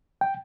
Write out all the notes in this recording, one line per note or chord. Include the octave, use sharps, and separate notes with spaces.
G5